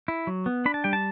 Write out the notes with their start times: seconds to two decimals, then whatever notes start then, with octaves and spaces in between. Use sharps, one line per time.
0.08 E4
0.27 F#3
0.46 B3
0.66 D4 B5
0.74 A5
0.84 G3 G5
0.93 A5